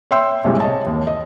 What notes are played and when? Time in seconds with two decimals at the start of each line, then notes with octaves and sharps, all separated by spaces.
0.11 C#5 E5 G5 C6 E6
0.44 B1 A2 C3 G3 G#3
0.60 C#5 D#5 A5
0.87 D#2
1.07 D#5